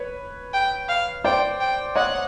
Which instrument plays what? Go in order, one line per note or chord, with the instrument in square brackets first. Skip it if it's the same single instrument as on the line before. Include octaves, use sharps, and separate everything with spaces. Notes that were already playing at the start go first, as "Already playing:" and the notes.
Already playing: [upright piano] B4 C#5
[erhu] G5
F5
[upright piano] C5 D5 [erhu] G5
[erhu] G5
[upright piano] C#5 D#5 [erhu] F#5